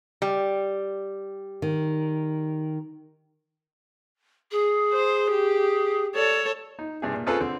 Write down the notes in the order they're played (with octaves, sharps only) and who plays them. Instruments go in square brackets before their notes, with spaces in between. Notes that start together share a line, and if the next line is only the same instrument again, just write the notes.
[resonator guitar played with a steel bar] G3
[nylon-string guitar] D#3
[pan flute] G#4
[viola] C5
G4
[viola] A4 C#5 [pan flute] D5
[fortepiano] D#4
G2 C3 G#4
A#2
C4 C#4 F4 G#4 A4 B4
D3 C4